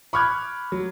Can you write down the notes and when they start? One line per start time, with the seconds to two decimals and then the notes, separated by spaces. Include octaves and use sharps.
0.13 B5 C#6 D6 F6 F#6 G#6
0.72 F#3